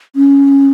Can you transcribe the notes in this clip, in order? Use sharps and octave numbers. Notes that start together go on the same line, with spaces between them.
C#4